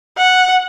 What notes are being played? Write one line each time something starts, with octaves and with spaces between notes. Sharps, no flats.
F#5